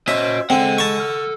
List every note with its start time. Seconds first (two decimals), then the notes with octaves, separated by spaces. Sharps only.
0.08 C#4 F#4 C5 D#5 E5
0.50 G#3 C4 A4 F#5 G#5
0.78 A5 C#6
1.00 F6